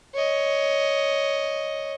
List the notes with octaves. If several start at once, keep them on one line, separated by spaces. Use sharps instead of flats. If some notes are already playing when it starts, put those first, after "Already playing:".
C#5 D#5